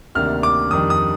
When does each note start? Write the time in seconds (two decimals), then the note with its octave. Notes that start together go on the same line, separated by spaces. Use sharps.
0.15 D2 C3 D#3 A#3 D4 F6
0.43 D6
0.70 F2 D#3 G3 D4 D#6
0.90 D#6